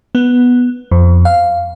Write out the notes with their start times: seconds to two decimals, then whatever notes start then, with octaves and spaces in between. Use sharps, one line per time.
0.15 B3
0.92 F2
1.25 F5